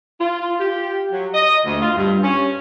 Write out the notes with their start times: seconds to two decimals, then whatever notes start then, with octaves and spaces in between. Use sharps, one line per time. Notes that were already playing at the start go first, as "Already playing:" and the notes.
0.19 F4
0.60 G4
1.12 F#3
1.34 D#5
1.66 D2
1.81 F4
1.97 G2
2.22 C#4